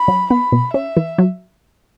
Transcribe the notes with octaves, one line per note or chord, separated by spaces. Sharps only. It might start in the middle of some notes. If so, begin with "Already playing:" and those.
Already playing: B5
F#3
B3 B5
B2
C#4 E5
E3
F#3